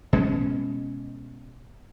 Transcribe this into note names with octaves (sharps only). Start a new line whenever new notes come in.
B2 G#3 A3 C#4